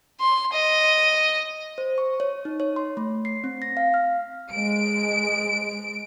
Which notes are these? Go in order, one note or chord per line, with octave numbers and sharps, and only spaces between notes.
C6
D#5
C5
C#6
C#5
D#4
C#5
C6
A3
C7
C4
A#6
F5
F6
G#3 D7